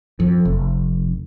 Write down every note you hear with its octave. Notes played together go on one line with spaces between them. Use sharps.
F2
F1